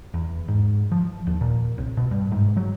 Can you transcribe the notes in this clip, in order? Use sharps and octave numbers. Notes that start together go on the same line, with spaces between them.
E2
G#2
F3
D#2
A#2
C2
B2
G2
G#2
F#3